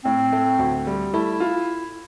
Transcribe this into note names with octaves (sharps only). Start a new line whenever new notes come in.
A2 C4
A3
D2
G3
A3 E4
F4